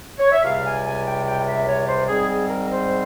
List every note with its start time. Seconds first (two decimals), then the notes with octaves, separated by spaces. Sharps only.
0.19 C#5
0.32 E5
0.44 C#2 C3 G3 F5
0.64 G#5
0.85 G#5
1.06 G5
1.25 G5
1.46 E5
1.67 C#5
1.87 C5
2.07 G#2 G3 C4 G#4
2.29 G#4
2.48 A#4
2.69 C5